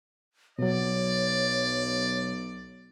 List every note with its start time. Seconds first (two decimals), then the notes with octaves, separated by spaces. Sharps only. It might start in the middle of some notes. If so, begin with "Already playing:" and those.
0.59 B1 B2 F#3 C#5 D5